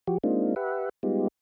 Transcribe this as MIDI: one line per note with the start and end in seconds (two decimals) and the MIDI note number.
0.07 0.18 53
0.07 0.18 66
0.07 0.18 67
0.24 0.55 56
0.24 0.55 58
0.24 0.55 60
0.24 0.55 62
0.24 0.55 63
0.24 0.55 65
0.56 0.89 67
0.56 0.89 71
0.56 0.89 76
0.56 0.89 78
1.03 1.28 55
1.03 1.28 56
1.03 1.28 59
1.03 1.28 63
1.03 1.28 65
1.03 1.28 67